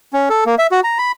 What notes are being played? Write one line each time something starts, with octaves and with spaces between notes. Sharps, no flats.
C#4
A4
A#3
E5
F#4
A#5
B5